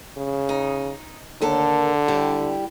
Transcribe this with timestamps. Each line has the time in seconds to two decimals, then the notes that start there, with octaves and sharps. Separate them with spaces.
0.17 C#3
0.49 D#4
1.41 D#2 D3 A4 A#4
2.08 G3 E4 G4